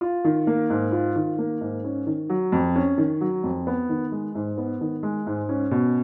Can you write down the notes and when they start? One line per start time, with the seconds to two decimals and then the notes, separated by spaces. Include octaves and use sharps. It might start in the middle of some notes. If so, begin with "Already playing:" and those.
0.01 F4
0.24 D#3
0.47 A#3
0.70 G#2
0.92 F4
1.16 D#3
1.38 A#3
1.61 G#2
1.84 C#4
2.07 D#3
2.29 F#3
2.52 F2
2.76 C#4
2.98 D#3
3.21 F#3
3.44 F2
3.67 B3
3.89 D#3
4.12 G#3
4.35 G#2
4.57 B3
4.81 D#3
5.03 G#3
5.27 G#2
5.49 C#4
5.71 B2